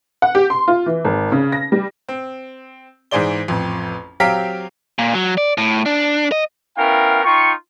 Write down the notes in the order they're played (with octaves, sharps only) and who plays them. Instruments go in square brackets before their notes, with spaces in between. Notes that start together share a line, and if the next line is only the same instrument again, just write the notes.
[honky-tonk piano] F#5
G4
C6
F4
E3
G#1
C#3
A#6
G3
[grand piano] C4
G#2 E3 G#4 C5 D5 G7
A1 F2
F#3 C4 G4 F5 A#5 B6
[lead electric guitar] A#2
F#3
D5
A2
D4
D#5
[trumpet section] B3 C#4 E4 A#4 F5 G5
D#4 F4 G5 C#6